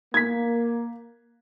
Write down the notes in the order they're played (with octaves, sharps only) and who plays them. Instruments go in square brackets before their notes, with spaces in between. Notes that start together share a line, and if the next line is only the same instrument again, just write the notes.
[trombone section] A#3 [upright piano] G#6 B6